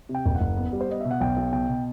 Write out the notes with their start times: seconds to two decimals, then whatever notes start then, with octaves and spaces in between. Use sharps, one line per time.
0.09 C3
0.15 G5
0.26 F#1
0.35 F#5
0.41 F#1
0.57 B3
0.73 G3
0.81 C5
0.89 B3 D#5
1.00 B2 E5
1.11 F#5
1.20 B1 G5
1.37 B1
1.52 B2 G5
1.69 B2